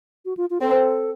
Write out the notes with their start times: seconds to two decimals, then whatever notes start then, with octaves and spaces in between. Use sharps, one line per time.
0.25 F#4
0.37 F4
0.50 F4
0.61 C4 A4